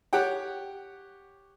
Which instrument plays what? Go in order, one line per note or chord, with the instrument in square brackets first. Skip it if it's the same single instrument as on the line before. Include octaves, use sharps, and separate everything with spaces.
[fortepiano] G4 C#5 F#5 G5